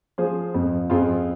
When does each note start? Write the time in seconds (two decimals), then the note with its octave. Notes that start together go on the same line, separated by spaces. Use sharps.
0.18 F3 G#4 C5
0.54 F2
0.90 F2 F4 G#4